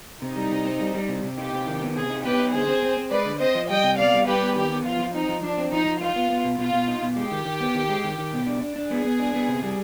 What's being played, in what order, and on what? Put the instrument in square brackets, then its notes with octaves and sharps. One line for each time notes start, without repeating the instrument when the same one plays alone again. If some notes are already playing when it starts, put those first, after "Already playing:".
[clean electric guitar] C3 [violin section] D#4
[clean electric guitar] G3
C3
C4
G3
G3
C3
C3
[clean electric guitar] D#4 [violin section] G4
[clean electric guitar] C3
D#3
B3
[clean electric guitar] C3 [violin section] G#4
[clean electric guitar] D#4
[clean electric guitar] B3 [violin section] G4 B4
[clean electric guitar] D#4
[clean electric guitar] D3 [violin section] G#4 C5
[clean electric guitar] C4
C4
C4
[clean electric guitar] G#3 [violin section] B4 D5
[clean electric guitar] D3
[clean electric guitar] C4 [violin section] C5 D#5
[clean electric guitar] F3
[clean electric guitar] G3 [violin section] D#5 G5
[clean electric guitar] C3
[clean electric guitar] B3 [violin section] D5 F5
[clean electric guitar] G3
[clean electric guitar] G3 [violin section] G4 B4
[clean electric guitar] B3
[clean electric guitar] D#3 [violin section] G4
[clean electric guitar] B3
[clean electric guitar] F3 [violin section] F4
[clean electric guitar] F3
[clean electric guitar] C4 [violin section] D#4
[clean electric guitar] F3
[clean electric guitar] F3 [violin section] D4
[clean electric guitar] C4
[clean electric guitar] F3 [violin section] D#4
[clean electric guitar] F3
[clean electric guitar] D#4 [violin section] F4
[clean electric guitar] B3
B3
B2
[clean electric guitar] B2 [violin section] F4
[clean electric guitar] B2
D#4
B2
[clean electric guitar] G#3 [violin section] G4
[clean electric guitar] D#3
D#3
B3
D#3
G#3
D#3
D#3
B2
D4
D4
D4
[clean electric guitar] B3 [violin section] G#4
[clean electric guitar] B3
D4
B3
C3
G3